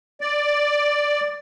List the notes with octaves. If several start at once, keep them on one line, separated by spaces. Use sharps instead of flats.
D5